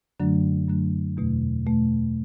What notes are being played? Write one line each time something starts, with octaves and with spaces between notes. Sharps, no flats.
F#2 D3 F#3 A3 D4
F#2 D3 F#3 A3 D4
E2 B2 A3
E2 B2 A3